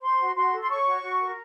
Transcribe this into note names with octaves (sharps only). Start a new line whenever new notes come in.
C5 C6
F#4
F#4 C6
A4
C6
C#5 C#6
F#4
F#4
A#4